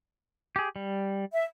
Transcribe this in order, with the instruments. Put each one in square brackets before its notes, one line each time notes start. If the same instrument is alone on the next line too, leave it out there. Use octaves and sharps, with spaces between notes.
[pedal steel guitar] G4 G#4
G3
[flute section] E5